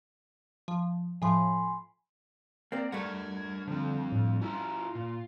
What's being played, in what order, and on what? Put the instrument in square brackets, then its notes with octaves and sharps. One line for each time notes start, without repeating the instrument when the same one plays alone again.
[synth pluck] F3
[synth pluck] A2 F3 [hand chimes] G#5 B5 C6
[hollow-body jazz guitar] A#3 C4 [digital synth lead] D5
[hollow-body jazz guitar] G2 A3 [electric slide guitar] A#4 F#5 [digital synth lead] G#6
[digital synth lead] D3 [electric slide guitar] F3 C4
[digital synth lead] A2
[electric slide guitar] C#4 E4 [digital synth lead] F4
[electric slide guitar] A#2